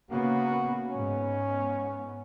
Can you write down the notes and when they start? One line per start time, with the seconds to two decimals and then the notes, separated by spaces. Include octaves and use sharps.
0.11 C#3 A#3 B3 F#4
0.90 G#2 B3 C#4